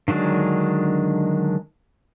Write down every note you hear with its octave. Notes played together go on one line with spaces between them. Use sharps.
D3 D#3 F#3 G#3 D4